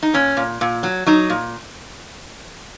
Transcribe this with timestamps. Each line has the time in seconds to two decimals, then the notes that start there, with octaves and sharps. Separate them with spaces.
0.03 D#4
0.14 A#2 C#4
0.37 A#2
0.61 A#2
0.83 F#3
1.06 F#3 D#4
1.30 A#2